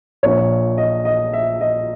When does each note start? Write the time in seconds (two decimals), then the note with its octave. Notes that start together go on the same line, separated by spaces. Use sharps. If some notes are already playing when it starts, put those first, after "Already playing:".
0.23 A#1 A#2 C#5
0.78 D#5
1.05 D#5
1.33 E5
1.61 D#5